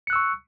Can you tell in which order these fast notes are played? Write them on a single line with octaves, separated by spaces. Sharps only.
C#7 F#6 E6 C#6